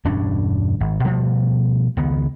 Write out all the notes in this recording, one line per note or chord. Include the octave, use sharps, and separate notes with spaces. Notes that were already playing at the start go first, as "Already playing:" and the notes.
E1 G2 C#4 D4
G#1
B2 F3 G3 A3
C#2 D#3 B3